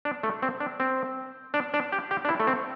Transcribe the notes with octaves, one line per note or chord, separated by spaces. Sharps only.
D4
A3
C4
D4
C4
D4
D4
G4
G4
D4
E4
A3
C4